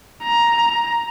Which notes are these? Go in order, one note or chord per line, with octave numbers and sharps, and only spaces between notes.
A#5